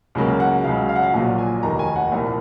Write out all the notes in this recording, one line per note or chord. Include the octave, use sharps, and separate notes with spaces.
C#2 C#3 F#3 A#3
F#5
C#2 C#3 F#3 F5
F5
F#5
F5
A#1 A#2 F#3
G#5
F1 D#2 D#3 A#3 A#5
G#5
F#5
C2 A#2 F3 A#3